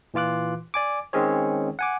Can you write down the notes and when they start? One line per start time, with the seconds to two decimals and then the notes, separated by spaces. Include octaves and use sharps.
0.14 A#2 E3 F4 D6 F#6
0.74 D5 G#5 D6
1.13 D#3 G#3 C4 C#4 G#4 C#5
1.79 F#5 G#5 D6